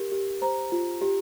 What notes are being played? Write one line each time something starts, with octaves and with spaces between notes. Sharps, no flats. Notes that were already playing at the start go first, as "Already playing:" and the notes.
Already playing: G4 A#4
G4
C5 A#5
F4
G4